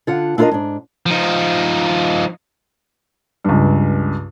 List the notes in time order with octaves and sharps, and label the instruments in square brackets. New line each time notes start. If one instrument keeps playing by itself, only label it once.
[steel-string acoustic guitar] D3 F4 F#5
D4 E4 F4 A4 A#4 D#5
G#2 D4
[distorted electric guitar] F3 D#4
[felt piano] C#2 G2